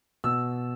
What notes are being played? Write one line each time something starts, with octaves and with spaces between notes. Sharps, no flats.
B2 E6